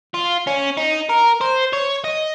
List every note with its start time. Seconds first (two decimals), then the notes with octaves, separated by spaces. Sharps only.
0.14 F4
0.47 C#4
0.77 D#4
1.10 A#4
1.41 C5
1.73 C#5
2.04 D#5